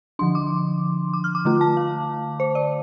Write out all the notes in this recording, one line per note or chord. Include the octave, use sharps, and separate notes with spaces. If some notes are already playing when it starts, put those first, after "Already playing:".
D3 F3 D4 C6
D6
D6
F6
D6
D3 A3 F4 D6
A5
F5
C5
D5